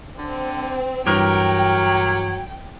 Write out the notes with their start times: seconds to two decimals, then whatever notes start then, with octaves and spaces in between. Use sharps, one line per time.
0.18 D3 C4
1.07 G2 E3 F#3 G4 A#4 G5